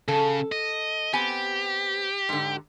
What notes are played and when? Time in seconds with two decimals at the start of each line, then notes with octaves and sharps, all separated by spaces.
0.08 C#3 A4
0.52 D#5
1.13 B3 C4 G4 G#5
2.29 G#2 D3